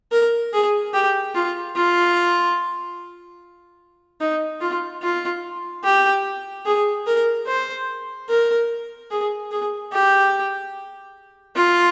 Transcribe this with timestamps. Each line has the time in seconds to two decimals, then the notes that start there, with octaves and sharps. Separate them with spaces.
0.12 A#4
0.53 G#4
0.94 G4
1.35 F4
1.76 F4
4.21 D#4
4.61 F4
5.03 F4
5.84 G4
6.66 G#4
7.07 A#4
7.47 C5
8.29 A#4
9.11 G#4
9.52 G#4
9.93 G4
11.56 F4